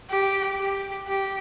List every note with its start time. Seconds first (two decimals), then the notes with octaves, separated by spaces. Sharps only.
0.10 G4
0.59 G4
1.07 G4